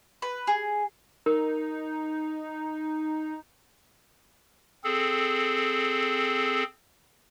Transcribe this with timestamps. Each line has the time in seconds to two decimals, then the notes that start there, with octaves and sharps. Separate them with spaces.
0.22 B4
0.47 G#4
1.26 D#4 A#4
4.84 C4 G#4 A4